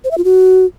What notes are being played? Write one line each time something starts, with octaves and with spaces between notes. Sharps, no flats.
C5
E5
F4
F#4